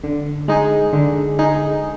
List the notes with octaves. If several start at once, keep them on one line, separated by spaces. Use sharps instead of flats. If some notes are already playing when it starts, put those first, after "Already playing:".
D3
G#3 D#4 G#4
D3
G#3 D#4 G#4